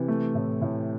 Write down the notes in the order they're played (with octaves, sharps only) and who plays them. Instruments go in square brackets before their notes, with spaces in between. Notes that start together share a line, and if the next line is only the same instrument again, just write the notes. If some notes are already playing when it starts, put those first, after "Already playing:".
Already playing: [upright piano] C3 E3
A3
A2
A2